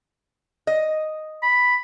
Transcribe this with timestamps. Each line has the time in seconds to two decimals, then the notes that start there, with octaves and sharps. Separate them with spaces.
0.67 D#5
1.43 B5